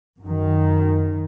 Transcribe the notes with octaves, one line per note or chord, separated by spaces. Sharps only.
F#2 D#3